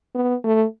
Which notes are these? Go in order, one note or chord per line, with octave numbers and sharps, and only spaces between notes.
B3
A3